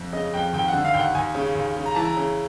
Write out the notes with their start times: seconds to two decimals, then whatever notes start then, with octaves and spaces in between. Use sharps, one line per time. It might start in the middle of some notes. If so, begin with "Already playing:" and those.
Already playing: F2
0.13 C#3 D#5
0.34 F2 G5
0.53 D#2 G5
0.68 F#5
0.73 D3
0.85 F5
0.93 D#2 G5
1.00 F#5
1.15 D#2 G#5
1.35 C#3
1.55 D#2
1.76 C#3
1.86 A#5
1.95 E3 A5
2.05 A#5
2.17 C#3